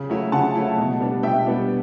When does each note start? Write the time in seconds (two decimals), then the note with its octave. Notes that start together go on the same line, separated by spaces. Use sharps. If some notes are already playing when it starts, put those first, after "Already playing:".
Already playing: C#3
0.10 F#3 A3 E4
0.32 C#3 F#5 A5
0.55 F#3 A3 E4
0.78 B2
1.00 G3 B3 D4
1.23 B2 E5 G5
1.46 G3 B3 D4